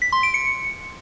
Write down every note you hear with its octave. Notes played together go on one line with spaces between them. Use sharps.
B6
C6
D7
C#7